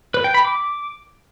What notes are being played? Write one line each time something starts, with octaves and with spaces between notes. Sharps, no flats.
B4
G5
B5
D6